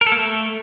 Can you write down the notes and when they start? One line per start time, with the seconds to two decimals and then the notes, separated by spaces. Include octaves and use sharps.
0.01 A#4
0.07 A4
0.12 A#3
0.17 A3